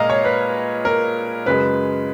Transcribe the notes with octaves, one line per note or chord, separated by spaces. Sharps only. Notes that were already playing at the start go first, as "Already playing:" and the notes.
Already playing: A#2 G#3 D#5 F5 A#5
C#5
B4
A#4
F#2 C#3 G#3 B4